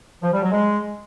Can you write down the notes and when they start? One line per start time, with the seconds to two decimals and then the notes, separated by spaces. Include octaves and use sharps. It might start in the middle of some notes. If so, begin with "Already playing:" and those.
0.23 F3
0.33 G3
0.42 F#3
0.52 G#3